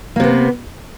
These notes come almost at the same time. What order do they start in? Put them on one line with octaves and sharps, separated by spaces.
A#3 C3 B3